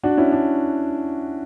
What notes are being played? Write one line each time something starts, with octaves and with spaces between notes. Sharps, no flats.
D4 F#4
C#4 E4
D4